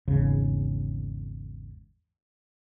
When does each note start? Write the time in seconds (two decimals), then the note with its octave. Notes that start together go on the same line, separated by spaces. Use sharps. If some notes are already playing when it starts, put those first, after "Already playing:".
0.08 G#1 E2 C#3